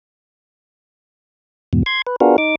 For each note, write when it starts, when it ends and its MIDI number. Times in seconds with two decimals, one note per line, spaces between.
1.73 1.83 40
1.73 1.83 44
1.73 1.83 47
1.86 2.02 84
1.86 2.02 92
2.07 2.16 71
2.20 2.37 59
2.20 2.37 62
2.20 2.37 65
2.20 2.37 66
2.20 2.37 68
2.20 2.37 70
2.38 2.55 63
2.38 2.55 86